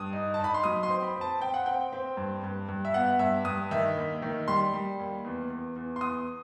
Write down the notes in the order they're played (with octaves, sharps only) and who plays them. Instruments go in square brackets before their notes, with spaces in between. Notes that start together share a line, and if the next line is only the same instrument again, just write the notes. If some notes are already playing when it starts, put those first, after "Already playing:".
Already playing: [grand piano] G2 D#6
D#4
A5
D#4 B5
C6
F#3 D#6
C6
C4
B5
C4
A5
C4 G5
F#5
C4 G5
C4
G2
G2
G2
E5
B3 F#5
G2 E5
G2 D#6
D#3 E5
D#2
D#3
G3 C6
G3
D#2
E2
E2
E2
C6
E2 D#6